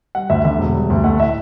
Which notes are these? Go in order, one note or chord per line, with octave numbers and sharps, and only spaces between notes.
G3 F#5
D2 E5
D3 E5
E1
G3
D2
A3 F#5
A2 E5